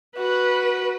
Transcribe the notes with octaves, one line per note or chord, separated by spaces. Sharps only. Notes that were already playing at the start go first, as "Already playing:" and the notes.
F#4 B4